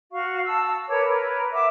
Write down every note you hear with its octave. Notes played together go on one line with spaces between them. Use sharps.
F#4 F5 C#6
A5 E6
A#4 B4 C#5 D6
A#4 B4
E5 F#5 D6